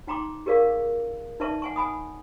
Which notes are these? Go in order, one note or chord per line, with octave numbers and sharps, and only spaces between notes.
D#4 G5 A#5 C6 D6
G4 G#4 A#4 D5 F5
D#4 B4 D5 E5 A5 C#6
F#5 G#5 C#6
F#5 G#5 B5 D#6